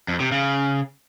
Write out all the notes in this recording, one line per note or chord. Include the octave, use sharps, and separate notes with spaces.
F2
C3
C#3